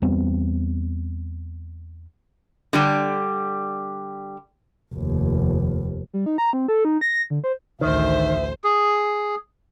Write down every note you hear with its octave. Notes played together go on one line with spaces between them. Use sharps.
E2 G3 B3 C4
D3 G3 G4
F1 D#2
G3
D#4
A#5
C4
A4
D#4
A#6
D3
C5
A1 D2 D#3 C5 E5
G#4